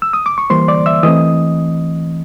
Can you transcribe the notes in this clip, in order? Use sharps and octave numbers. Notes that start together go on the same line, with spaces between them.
E6
D#6
D6
C#6
E3 G3 A#3 C5 C6
D5 D6
E5 E6
E3 A3 C4 D#5 D#6